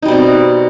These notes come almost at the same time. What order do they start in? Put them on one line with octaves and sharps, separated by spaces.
D#4 G3 B2 C4